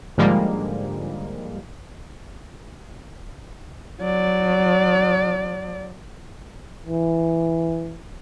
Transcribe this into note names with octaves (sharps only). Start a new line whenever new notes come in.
G#2 D3 F3 G3 G#3 A#3
F#3 D5
E3